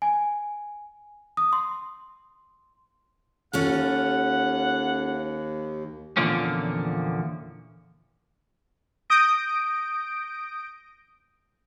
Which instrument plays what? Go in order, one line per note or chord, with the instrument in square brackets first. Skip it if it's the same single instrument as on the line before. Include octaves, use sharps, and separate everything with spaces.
[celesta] G#5
D#6
C6
[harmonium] D#2 [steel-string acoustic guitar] C#4 F4 A4 [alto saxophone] F#5
[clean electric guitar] E2 A#2 D3 F3 A#3 C#4
[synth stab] D#6 G6 A#6 D7